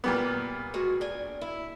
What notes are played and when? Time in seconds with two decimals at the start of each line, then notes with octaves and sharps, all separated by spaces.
0.04 A#2 G3 B3
0.74 G#3 F#4 G#4
1.01 D4 G#5
1.41 E4